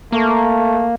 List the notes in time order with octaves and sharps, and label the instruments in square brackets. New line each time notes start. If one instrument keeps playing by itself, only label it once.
[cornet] A3 [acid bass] A#3